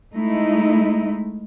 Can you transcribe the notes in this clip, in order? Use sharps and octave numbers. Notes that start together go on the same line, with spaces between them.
G#3 A3 D#4 E4